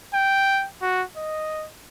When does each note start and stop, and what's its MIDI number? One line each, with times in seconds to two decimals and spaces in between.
0.14 0.66 79
0.82 1.03 66
1.17 1.66 75